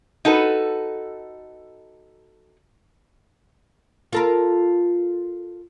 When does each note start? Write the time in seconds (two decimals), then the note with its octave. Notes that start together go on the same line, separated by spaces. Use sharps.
0.25 D#4 F#4 A4 B4
4.13 F4 A4 A#4